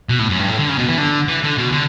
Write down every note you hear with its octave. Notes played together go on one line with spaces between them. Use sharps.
B2
A2
F#2
G2
A2
D3
C#3
B2
E3
D3
E3
D3
B2
D3